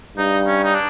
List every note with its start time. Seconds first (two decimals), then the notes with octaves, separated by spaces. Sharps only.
0.17 G2 D#4
0.46 C#4
0.63 D#4
0.75 D4